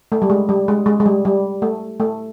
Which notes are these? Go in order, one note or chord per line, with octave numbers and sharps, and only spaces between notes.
A3
G3
G#3
G3
G#3
G#3
G#3
G3
G3
A3
A3